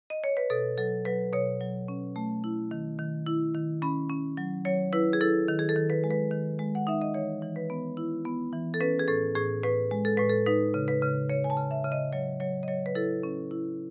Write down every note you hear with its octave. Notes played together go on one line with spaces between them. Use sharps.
D#5
C#5
B4
B2 A4
F#3 A4
F#3 B4
B2 C#5
F#3
C#4
A3
E4
D#3
D#3
E4
D#3
C#4 B5
C#4
F#3
F#3 C#5
E4 B4
G#4
E4 A4
D#3
G#4
A4
D#3
B4
G#3
B4
D#3
G#3
F#5
D#4 E5
D#5
E3 C#5
E3
B4
B3
E4
B3
E3
A4
C#4 B4
G#4
A2 A4
A2 G#4
A2 B4
G#3
A4
A2 B4
A4
D#4 B4
C#3
B4
C#3
C#3 C#5
G#5
A5
C#3
E5
C#3
D#5
F#3 C#5
F#3 C#5
D#5
F#3 C#5
B4
E4 A4
C#4
E4